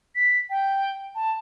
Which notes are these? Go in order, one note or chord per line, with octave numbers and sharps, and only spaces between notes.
B6
G5
A5